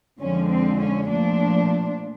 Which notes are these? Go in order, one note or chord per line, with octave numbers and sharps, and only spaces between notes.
F2 D3 F3 G#3 C#4
C4
C#4
A#2 F3 A3 D4